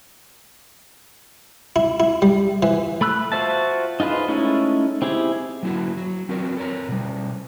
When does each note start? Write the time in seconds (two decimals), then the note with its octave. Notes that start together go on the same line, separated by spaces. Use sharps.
1.76 E4
2.00 E4
2.22 G3
2.63 E3
3.01 A3 B5 E6 F#6
3.32 F4 F#4 C5 E5 A5
4.00 D#4 F4 G#4 B4 C5
4.28 G#3 A3 C#4 D#4 E4
5.02 C4 E4 G4 G#4
5.63 F#3 A#3 E4 F#4
5.97 F#3
6.29 C4 F#4 A#4 B4
6.57 A4 A#4 C#5 A#5
6.88 B2 G3